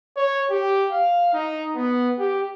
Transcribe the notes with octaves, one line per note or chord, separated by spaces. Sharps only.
C#5
G4
F5
D#4
B3
G4